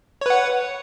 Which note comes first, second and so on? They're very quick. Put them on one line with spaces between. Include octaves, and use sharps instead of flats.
C#5 B4 F#5